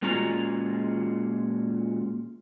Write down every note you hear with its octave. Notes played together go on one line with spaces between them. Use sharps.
A#2 G#3 C#4 F4 F#4 A#5